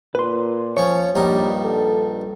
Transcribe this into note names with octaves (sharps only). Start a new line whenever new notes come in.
A#2 B4 C6
F3 C#4 C#5
A#1 G2 G3 D#4
A4